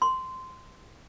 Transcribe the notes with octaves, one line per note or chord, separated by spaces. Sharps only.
C6